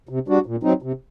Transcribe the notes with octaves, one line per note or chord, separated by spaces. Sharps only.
C3
G3 D4 F#4
A#2
F#3 C4 D#4
C3